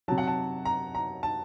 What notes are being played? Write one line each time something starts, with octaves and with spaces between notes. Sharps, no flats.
C3 F#3 A5
F#5
A5
A#5
A#5
A5